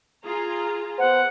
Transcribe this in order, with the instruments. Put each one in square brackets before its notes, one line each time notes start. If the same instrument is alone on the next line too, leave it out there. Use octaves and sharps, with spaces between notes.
[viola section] F4 G#4 A#5
[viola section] B3 [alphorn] C5 [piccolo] F#5